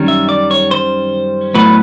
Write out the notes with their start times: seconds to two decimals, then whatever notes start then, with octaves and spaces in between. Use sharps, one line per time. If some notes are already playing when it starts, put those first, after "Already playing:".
Already playing: F#2 D#3 G3 C#4
0.08 E5
0.29 D5
0.51 C#5
0.71 C5
1.55 A2 F#3 B3 B4